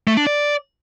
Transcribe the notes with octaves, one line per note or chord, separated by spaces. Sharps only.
A3
D4
D5